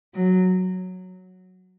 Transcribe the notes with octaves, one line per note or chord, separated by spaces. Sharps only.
F#3